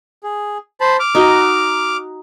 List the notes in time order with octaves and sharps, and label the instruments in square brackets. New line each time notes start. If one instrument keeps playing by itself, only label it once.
[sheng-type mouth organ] G#4
C5 A5 B5
D6 F6
[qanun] D#4 F#4 D#5